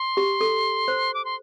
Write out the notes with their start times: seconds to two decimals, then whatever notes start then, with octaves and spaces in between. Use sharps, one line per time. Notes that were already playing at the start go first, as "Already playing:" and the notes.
Already playing: C6
0.17 G4
0.41 A4
0.88 C5
1.14 D6
1.25 C6